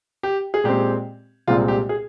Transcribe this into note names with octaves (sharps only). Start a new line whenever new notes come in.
G4
G#4
A#2 G#3 C4 G4
C2 A#2 G#3 C4 F4
G4
G#4